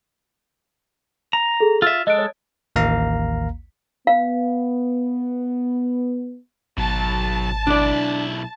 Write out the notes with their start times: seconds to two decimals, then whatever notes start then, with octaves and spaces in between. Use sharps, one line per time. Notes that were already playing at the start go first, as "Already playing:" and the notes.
1.33 A#5
1.60 G#4 A4
1.82 F4 E5 E6 A6
2.07 G#3 A4 D#5 F#6 D7
2.18 C#5
2.76 A1 D#2 A#3 F5 A#5
4.07 B3 F5
6.78 G#1 B2 F#3 A5
7.67 B1 D4 E4 D5